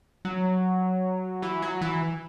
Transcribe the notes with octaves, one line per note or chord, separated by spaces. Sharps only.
F#3
E3
F#3
E3